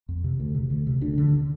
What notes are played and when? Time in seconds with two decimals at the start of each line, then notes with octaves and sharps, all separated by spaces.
0.09 F2
0.24 C3
0.40 D2
0.54 C3
0.70 D2
0.87 C3
1.01 D2 D4
1.18 D3